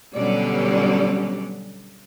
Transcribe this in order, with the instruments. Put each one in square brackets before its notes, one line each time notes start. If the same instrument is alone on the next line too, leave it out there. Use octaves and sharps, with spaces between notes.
[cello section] B2 D3 F#3 G3 C#4 D5